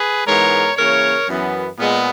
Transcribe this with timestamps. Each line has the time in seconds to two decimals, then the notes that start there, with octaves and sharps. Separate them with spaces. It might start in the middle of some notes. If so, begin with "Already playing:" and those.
Already playing: G#4 B4
0.25 G#2 E3 G#3 B3 A#4 C#5
0.76 C#3 E3 A#3 A#4 C#5
1.27 F#2 E3 B3
1.78 A#2 G#3 B3